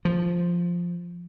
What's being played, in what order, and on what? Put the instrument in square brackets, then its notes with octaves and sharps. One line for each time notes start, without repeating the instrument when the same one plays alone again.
[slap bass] F3